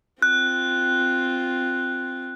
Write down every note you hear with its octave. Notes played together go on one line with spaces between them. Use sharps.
C4 F4 F#6